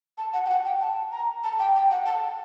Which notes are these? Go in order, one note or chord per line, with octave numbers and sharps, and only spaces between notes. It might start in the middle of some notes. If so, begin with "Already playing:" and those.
A5
F#5
G5
F#5
G5
A5
A#5
A5
G5
G5
F#5
A5